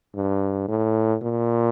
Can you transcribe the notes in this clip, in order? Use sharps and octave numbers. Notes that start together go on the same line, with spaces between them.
G2
A2
A#2